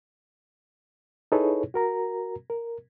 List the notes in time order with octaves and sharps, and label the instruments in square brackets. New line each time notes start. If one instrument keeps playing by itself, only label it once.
[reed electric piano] D#4 E4 G#4 A4 B4 C#5
F#4 A#4 A#5
A#4